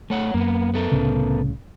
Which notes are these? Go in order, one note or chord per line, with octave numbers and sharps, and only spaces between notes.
A3 C#5 F#5
F#2 A#3 B3
B3 A4 A#4
C2 A2 C#3